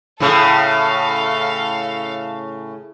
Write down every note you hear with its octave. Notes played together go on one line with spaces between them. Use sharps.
A2 C#3 A4 F5